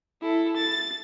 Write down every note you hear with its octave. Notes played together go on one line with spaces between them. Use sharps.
E4 A4
A6